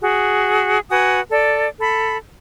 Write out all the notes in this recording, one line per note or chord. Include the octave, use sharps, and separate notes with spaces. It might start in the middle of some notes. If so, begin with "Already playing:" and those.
F#4 G#4
F#4 B4 G#5 D#6
A4 D5
A4 B5